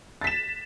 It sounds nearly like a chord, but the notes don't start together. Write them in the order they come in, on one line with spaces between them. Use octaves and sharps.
A6 B6 E7